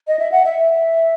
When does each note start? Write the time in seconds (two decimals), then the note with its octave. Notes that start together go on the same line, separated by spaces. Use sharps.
0.08 D#5
0.19 E5
0.32 F#5
0.45 E5